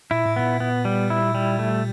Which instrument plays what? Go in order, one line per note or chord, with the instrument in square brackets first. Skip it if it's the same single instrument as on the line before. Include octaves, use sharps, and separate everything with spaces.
[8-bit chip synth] A#2 [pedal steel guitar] E4
[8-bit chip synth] A2
[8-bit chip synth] A#2 [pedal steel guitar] B3
[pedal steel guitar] B3
G3
E4
G3
A3